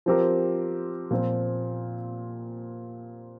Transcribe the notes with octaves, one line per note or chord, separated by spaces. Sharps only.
F3 C4 G4 A#4
A#2 F3 C4